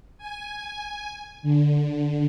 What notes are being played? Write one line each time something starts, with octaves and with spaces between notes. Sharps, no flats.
G#5
D3